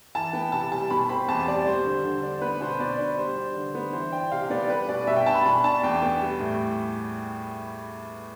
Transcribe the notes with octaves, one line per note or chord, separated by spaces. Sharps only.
E3 A5
B3 G5
C3 A5
G3 A5
B2 B5
C4 B5
E2 A5
G3 D5
G3 C5
D3
D3
D4
B3 B4
B2 C5
B2 D5
D4
G3 C5
D4
D3
B3
E3 C5
D4 G5
C3 F5
B3 D5
G3 B4
B2 D5
B2 E5
G5
D4 A5
B5
B2 B5
D4 A5
E2 G5
B3 G5
G3
A2